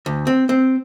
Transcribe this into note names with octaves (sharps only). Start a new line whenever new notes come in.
D2
C4
C4